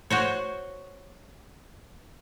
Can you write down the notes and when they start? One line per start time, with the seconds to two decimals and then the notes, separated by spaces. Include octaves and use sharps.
0.10 F#4 C5 C#5